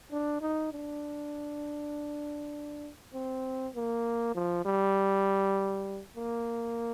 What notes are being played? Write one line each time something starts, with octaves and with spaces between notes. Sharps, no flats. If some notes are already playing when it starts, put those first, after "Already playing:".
D4
D#4
D4
C4
A#3
F3
G3
A#3